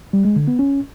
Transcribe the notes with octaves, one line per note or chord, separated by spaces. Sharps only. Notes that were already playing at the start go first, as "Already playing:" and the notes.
G3
G#3
D3
B3
C#4